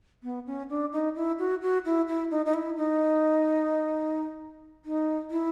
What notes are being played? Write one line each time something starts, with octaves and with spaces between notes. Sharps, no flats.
B3
C#4
D4
D#4
E4
F#4
F#4
E4
E4
D#4
D#4
E4
D#4
D#4
E4